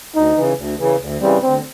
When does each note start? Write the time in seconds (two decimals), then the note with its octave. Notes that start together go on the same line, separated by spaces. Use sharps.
0.15 D2 D#4
0.36 C#3 E3
0.58 D2
0.79 C#3 E3
1.01 D2
1.21 C#3 E3 G3 C4
1.43 D2 C4